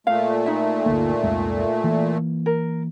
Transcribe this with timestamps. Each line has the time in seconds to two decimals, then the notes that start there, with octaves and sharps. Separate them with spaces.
0.07 A#2 A3 F5
0.46 D#4 E5
0.86 G1 D2 A#3
1.23 C2 F2 G#3
1.84 E3 A#3
2.46 A#4